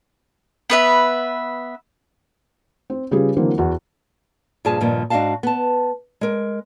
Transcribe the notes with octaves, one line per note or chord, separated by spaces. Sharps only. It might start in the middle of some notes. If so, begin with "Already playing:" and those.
B3 B4 E5
C4
C#3 G3 F4 G#4 B4
D3 E3 F#3 A#3 C4
E2 F#4
G2 A#2 F3 G#4 G#5 A5
G2 A#2 D#3 F3 A#3
G#2 D4 F#4 D#5 F5 A5
B3 A5
G#3 A#4